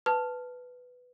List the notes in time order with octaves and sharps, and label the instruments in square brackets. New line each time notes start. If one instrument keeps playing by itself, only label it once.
[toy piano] B4 [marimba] A5